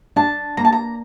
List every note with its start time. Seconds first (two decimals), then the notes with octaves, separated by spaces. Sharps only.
0.16 D4 A5
0.57 A#3 A#5
0.65 A5
0.73 A#5